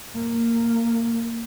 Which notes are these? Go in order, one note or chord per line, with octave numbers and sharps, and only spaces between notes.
A#3